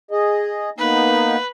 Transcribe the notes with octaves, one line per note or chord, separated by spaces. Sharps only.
G#4 D#5
A#3 B3 D#4 B4